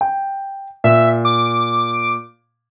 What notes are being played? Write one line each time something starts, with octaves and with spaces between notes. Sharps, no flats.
G5
A#2 E5
D6